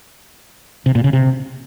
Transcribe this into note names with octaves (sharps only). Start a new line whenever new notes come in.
C3
A#2
C#3
C3